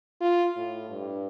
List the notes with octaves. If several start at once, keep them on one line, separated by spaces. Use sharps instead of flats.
F4
A2
G2